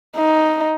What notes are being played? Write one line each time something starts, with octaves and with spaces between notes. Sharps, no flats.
D#4